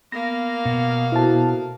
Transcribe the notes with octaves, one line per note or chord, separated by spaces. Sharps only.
A#3 B3 F5 A#6
B2
E4 F#4 A4 C5 A5